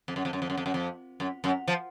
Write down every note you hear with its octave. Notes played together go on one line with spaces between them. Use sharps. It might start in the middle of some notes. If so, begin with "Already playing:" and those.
F2
F#2
F2
F#2
F2
F#2
F2
F#2
F2
F#2
F#2
F3